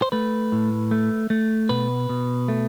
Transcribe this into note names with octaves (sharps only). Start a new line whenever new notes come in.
C5
A3 B4
A2
A3
A3
B2 B4
B2
A3